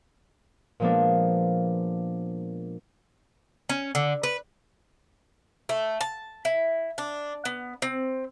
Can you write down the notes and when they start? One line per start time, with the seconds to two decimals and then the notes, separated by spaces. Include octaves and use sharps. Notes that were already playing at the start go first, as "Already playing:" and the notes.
0.80 A#2 F3 G#3 A#3 B3 D4
3.69 C#4
3.95 D3
4.23 B4
5.69 A3
6.01 A5
6.45 E4
6.98 D4
7.45 B3
7.82 C4